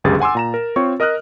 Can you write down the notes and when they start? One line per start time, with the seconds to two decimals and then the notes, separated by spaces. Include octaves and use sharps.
0.04 G1 C#2 F#2 G4 G#4 A6
0.20 F#5 G#5 C6 D6 E6
0.35 A#2 A#5 E7
0.54 A#4
0.76 C4 F4 C#5 C#6
1.00 A#4 D#5 D#6 F6 F#6